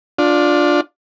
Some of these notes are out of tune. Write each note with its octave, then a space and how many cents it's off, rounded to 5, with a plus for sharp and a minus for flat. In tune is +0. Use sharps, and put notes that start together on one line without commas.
D4 +0 F4 +25